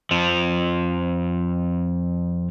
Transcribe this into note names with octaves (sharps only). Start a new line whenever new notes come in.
F2 F3